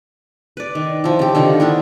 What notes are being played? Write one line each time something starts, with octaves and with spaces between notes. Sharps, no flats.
B4 D5
D#3
F3 E4
C#3 G4
D3 D#3 F4 F#5
B3 D4 E4